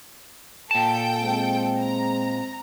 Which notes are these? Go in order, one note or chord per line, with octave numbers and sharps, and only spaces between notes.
A#2 A4 G5 A5
G#3 C4
A#5